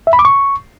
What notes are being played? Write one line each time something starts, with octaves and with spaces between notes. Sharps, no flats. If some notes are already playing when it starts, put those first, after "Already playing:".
E5
B5
D6
C#6